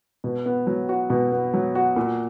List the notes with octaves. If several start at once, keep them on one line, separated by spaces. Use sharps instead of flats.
B2
B3
F#3
F#4
B2
B3
F#3
F#4
A#2